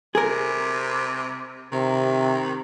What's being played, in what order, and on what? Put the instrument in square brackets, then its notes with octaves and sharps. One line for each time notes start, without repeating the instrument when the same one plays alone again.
[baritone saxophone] C3 [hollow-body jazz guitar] G#4 A#4
[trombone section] C3 [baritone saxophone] D#3